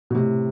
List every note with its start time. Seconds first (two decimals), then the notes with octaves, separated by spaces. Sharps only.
0.10 B2
0.14 A2 C3